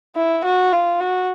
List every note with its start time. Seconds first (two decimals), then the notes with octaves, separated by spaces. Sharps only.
0.16 E4
0.44 F#4
0.73 F4
1.00 F#4